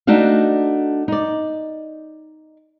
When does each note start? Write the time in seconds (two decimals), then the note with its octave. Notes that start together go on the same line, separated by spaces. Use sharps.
0.07 A3 D4 D#4 F#4 F5
1.08 D#4 D5